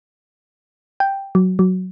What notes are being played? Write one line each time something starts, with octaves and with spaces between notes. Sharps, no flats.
G5
F#3
F#3